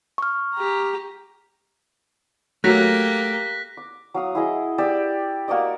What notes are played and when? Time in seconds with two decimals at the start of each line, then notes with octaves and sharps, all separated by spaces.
0.18 C#6 F6
0.55 G4 A#5
2.64 F#3 A3 A#3 G4 F#6 A#6 B6
3.77 D6
4.14 F#3 F5 D#6
4.35 E4 G#4 D#5
4.78 G4 D5 E6
5.48 A#3 F#4 D5 D#5